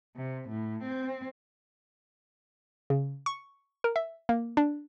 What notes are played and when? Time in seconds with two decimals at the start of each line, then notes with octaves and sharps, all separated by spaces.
0.16 C3
0.48 A2
0.83 C4
2.90 C#3
3.26 C#6
3.84 A#4
3.96 E5
4.29 A#3
4.57 D4